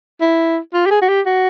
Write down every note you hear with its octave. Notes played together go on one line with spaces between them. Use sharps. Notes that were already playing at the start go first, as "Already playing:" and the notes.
E4
F4
G4
G#4
F#4
G4
F#4